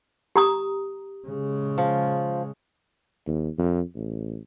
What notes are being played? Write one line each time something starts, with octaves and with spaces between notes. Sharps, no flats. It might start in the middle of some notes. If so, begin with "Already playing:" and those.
G4 A#5 D#6
C#3 G#3
F3
D#2
F2
A1